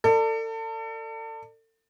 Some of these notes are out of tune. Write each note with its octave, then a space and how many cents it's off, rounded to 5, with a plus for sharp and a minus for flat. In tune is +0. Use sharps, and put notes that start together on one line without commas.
A4 +35 D5 +25